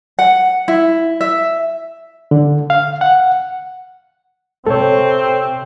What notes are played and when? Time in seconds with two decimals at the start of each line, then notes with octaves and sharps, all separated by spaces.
0.19 F#5
0.68 E4
1.21 E5
2.31 D3
2.70 F5
3.01 F#5
4.67 C3 C4 A4 C#5